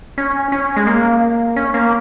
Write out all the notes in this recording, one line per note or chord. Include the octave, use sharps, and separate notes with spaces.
C#4
C#4
G#3
A#3
C#4
A#3